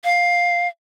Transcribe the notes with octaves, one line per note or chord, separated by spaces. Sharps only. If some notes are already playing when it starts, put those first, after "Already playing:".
F5